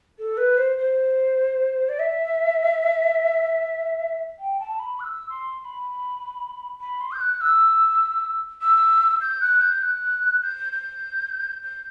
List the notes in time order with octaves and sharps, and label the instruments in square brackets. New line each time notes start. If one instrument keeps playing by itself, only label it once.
[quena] A4
B4
C5
C5
D5
E5
G5
A5
B5
F#6
E6
C6
C6
B5
B5
C6
G6
F#6
E6
E6
G6
F#6
G6
F#6
G6
G6
G6